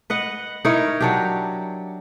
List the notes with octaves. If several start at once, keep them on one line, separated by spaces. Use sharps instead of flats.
B4 D#5 F#5
D#4 E4 A#4 C#5
F#3 D4 G4